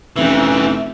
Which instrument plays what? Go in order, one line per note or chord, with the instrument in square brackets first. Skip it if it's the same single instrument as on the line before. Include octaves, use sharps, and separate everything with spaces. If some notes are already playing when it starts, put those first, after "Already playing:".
[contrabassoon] F1 [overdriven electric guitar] E3 C4 [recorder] C#4 [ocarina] E5